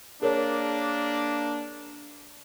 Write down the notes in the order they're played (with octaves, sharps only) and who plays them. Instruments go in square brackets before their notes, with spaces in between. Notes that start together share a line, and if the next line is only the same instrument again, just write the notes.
[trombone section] A#3 D4 [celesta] G#4 A#4 C#5